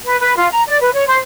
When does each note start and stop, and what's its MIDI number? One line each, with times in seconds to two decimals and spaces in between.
0.05 0.19 71
0.20 0.34 71
0.38 0.48 65
0.51 0.63 82
0.68 0.78 74
0.81 0.90 71
0.94 1.07 73
1.07 1.18 72